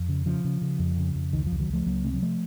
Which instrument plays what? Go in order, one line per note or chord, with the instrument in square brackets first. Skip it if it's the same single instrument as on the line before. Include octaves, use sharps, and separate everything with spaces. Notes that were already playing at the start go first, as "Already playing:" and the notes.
Already playing: [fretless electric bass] F2
C#3
C#3 F3
C#3
C#3
F2
C#3
F2
C#2 D#3
C#2 F3
D#3 F#3
C#2 F3 A3
C#2 F#3 A#3
C3 A3 C4
F#3
F3 A3